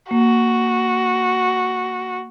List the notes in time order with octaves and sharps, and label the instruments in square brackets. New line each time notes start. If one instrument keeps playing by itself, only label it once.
[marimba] A#3 [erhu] F#4